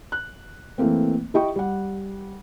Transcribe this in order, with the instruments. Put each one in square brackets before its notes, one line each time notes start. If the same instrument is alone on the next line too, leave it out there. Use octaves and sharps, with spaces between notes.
[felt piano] F#6
E3 A3 A#3 C4
E4 G4 D#5 G5 C#6
G3 F#5